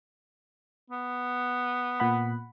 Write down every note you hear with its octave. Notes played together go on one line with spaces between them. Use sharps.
B3
A#2 F#5 B5